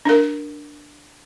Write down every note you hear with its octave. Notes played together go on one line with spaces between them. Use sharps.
D4 A#4